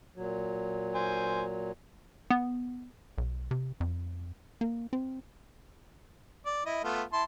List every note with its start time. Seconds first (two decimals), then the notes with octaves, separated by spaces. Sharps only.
0.16 A#2 F#3
0.95 C5 G#5
2.30 B3
3.18 B1
3.51 C3
3.80 F2
4.61 A#3
4.93 C4
6.46 D5
6.66 E4 D#5
6.84 A3 B3 F4
7.13 E4 A5 C6